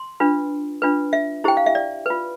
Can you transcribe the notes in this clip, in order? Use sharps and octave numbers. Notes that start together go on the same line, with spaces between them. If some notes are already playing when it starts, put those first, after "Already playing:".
Already playing: C6
D4 F4 B4
D4 F4 B4
E5
E4 G4 C5 G5
F5
E5
D5
F4 B4